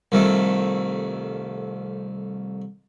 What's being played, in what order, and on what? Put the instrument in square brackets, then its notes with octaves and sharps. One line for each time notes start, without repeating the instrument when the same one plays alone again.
[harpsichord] C2 F2 D#3 A3